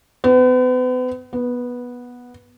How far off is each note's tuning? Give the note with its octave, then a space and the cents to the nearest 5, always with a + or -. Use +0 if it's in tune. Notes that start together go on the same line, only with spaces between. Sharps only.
B3 +40
B3 -10